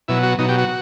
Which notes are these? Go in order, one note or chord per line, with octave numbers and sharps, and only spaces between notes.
B2 F#3 E4
F#4
B2 F#3 D#4
G4
F#4